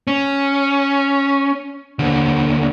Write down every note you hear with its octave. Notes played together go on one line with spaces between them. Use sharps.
C#4
D#2 D3